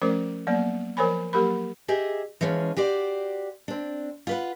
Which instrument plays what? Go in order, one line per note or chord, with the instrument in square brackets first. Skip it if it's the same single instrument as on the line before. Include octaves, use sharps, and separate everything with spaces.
[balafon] F3 A3 C#4 A#4 C5 D6
F#3 A#3 B3 D5
F3 A#4 C5 C#5 G#5 B5
F#3 A#3 G4 A#4 B5
[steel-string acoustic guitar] G4 G#4 D#5 E5
E3 F3 G#3 C#4 F4
F#4 G4 C5 D5
C4 D4
F4 B4 F#5